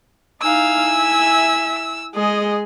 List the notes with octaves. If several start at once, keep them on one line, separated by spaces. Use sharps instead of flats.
D#4 E4 F5 G#5 E6
E5
G#3 G#4 D#5